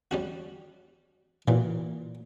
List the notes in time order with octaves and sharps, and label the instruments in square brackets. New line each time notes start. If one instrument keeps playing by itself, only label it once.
[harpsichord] G3 C#4 F#4
[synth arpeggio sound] A#2 [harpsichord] E3 F#3